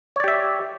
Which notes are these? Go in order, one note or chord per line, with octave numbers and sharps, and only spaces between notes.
G4 C#5 D5 E5